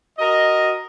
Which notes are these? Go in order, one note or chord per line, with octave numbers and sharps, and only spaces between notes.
F#4 A#4 D#5